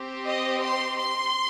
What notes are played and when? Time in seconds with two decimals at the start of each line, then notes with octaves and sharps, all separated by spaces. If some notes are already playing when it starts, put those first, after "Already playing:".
Already playing: C4 G4
0.26 D#5
0.62 C6
0.98 C6